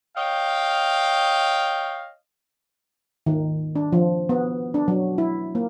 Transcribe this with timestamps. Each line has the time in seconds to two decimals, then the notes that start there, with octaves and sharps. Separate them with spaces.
0.17 C#5 D#5 F5 G5
3.26 D#3
3.76 D4
3.93 F3
4.29 B3
4.74 D4
4.88 F#3
5.18 E4
5.55 A#3